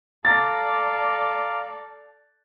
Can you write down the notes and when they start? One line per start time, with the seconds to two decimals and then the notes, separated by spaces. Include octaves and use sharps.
0.25 A4 D5 F5 A#5 D6 A6